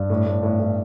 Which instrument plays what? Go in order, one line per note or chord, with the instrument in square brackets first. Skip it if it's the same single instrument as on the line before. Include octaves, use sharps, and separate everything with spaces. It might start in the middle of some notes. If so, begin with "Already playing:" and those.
Already playing: [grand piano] G2
[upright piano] A2
A2
A2
A2